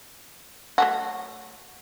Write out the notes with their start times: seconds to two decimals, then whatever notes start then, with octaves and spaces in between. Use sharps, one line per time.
0.78 F#3 A3 F#4